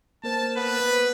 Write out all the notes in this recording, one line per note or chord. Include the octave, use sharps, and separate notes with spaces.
A#3 A#4 C5 A5
B3 B4